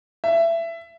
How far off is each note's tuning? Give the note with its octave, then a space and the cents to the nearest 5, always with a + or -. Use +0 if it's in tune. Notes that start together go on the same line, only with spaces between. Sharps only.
E5 +20